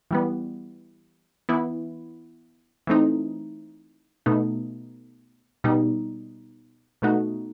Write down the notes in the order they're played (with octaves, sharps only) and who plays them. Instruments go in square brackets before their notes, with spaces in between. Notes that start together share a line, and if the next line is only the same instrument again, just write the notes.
[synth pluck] E3 G3 B3
E3 B3 E4
E3 A3 C4 D#4
B2 A3 D#4
B2 G3 D#4
B2 A3 D#4 F#4